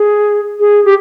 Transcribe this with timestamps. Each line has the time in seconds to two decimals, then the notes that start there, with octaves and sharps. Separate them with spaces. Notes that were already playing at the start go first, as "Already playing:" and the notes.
Already playing: G#4
0.60 G#4
0.85 G4